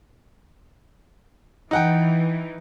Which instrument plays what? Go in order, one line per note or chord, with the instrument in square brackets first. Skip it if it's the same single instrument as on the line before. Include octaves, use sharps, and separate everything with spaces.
[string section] E3 [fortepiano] D#4 F#5 G5